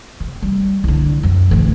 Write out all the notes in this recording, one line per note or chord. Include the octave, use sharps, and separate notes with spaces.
C3
G3
C2 D3
F#2 C3
A1 D2